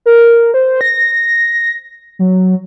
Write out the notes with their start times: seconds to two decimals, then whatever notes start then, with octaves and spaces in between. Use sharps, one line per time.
0.06 A#4
0.54 C5
0.81 A#6
2.19 F#3